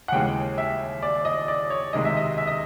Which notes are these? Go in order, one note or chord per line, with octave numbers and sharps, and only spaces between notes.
F#5
D#2 C#3 E3 G#3 G5
E5
D5
D#5
D5
C#5
C#2 C3 D#3 G#3 D#5
E5
D#5
E5
D#5